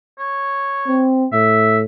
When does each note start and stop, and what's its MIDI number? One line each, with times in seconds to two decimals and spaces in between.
0.19 1.05 73
0.87 1.25 60
1.33 1.85 45
1.33 1.78 76